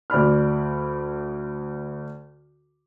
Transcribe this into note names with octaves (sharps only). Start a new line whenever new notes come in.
D2 D5 B5 F6